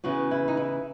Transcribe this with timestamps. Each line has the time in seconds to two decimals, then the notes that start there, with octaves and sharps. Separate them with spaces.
0.04 E2 C#3 E3 F#4
0.31 E4
0.48 D#4
0.57 E4